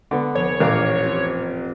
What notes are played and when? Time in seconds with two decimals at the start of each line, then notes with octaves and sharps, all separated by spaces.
0.11 D3 B3
0.35 F1 C#5
0.60 A1 A#2 A#4 F5 D6
1.04 C4 F4 G4